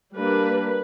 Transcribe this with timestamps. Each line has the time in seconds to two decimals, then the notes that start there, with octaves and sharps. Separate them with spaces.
0.16 G3 A#3 D4 B4